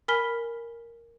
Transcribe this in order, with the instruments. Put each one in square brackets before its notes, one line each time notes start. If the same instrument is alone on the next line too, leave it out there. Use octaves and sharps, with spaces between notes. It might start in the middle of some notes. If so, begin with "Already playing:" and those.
[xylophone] A#4 G#5 B5 F6 B6 G7